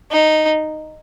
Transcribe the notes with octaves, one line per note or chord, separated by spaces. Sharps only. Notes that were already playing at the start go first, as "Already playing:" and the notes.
D#4